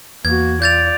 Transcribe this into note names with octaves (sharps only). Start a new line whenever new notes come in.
E2 A#3 F#4 G#6
F4 D5 G6 A6 F7